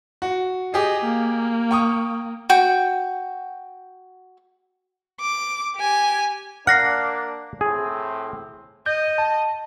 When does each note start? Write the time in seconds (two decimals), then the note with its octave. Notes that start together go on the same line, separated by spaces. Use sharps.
0.22 F#4
0.74 G4 G#4 D#5
1.04 A#3
1.71 G5 C#6 D#6
2.50 F#4 G5
5.21 D6
5.76 G4 G#5
6.67 A#3 D4 F#5 F6 A#6 C7
7.61 A2 C4 G#4
8.86 D#5 G6
9.18 A5